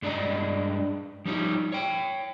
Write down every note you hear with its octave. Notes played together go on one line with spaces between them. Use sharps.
G2 G#3 D4 D5 D#5 A#5
F3 G3 D#4 C#5
C#5 G5